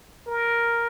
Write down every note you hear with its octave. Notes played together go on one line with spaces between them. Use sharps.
A#4